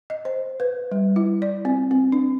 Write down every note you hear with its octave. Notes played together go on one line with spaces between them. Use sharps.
D#5
C5
B4
G3
E4
D5
C4
C4
D4